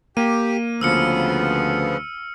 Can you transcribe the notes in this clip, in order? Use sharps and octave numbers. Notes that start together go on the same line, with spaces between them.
A#3 G4 D#7
D2 C#3 F3 B3 E6 F6 C#7